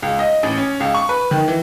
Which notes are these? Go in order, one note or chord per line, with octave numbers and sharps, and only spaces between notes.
C#2
D#5
A1
C#4
C#2
C#6
B4
D#3
E3